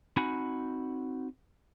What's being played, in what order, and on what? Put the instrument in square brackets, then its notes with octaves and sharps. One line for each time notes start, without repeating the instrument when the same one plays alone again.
[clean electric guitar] C4 D#4 F#4 F#5 G#5 B5